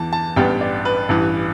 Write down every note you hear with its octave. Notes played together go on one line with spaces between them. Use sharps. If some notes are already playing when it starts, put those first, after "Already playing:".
Already playing: E2 E3 A5
A5
A1 G2 G3 B3 G5
D5
B4
A1 G2 E3